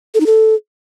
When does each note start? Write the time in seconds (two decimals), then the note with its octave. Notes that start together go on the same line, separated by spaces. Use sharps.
0.14 A4
0.20 D#4
0.26 A4